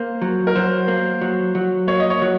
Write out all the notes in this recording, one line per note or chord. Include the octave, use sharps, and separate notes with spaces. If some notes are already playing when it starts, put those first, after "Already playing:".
Already playing: A#3 C5
F#3
A#4
F#3 C5
A#3
F#3
F#3
A#3 C#5
D#5
C#5
F#3